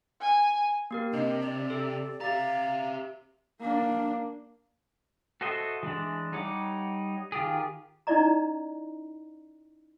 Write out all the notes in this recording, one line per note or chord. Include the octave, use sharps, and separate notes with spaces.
G#5
A#3 G4 A#4
C3 D4 D#5
D5
G4 A4
G4 E5 F5 A#5 A6
A#3 D4
F#4 A4 C5 D#5 E5
E3 G#3 D4
G3 D#4 C#5 F#5 D6
D#3 F4 G4 G#4
C#4 D#4 E4 D5 D#5 A#5